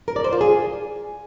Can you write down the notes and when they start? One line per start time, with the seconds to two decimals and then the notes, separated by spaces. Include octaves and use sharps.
0.08 A#4
0.16 D5
0.24 C5
0.33 F4
0.41 G#4